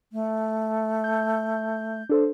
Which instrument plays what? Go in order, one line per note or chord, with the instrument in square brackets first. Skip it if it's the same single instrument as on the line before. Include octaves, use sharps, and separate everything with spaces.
[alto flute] A3
[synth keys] G6
D4 A4 C5